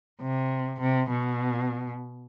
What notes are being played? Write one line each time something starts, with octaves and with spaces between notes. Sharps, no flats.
C3
C3
B2